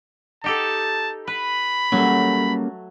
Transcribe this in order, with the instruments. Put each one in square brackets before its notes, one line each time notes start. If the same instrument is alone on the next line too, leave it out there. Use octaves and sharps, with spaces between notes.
[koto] D#4 G4 A4 [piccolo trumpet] A5
[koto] B4 [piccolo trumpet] B5
[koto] F#3 A3 [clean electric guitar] G3 A#3 C#4